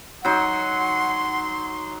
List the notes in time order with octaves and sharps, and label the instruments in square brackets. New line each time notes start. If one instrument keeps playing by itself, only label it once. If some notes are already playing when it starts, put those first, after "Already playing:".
[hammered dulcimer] F#3 D#4 [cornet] F#5 [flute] C6